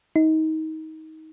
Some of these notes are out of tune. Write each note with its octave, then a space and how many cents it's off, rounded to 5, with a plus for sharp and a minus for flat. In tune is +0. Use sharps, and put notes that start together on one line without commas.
D#4 +25